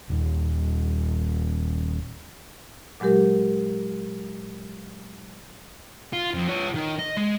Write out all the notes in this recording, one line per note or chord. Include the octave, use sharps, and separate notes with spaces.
D#1 D#2
A#2 F#3 G#3 G4 A#4
F4
F2
F4 C#5
D#3
D#5
G#3